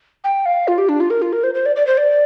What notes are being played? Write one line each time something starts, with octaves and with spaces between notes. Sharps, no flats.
G5
F5
F4
G4
D4
F4
A#4
F4
A#4
C5
C5
D5
D5
C5
D5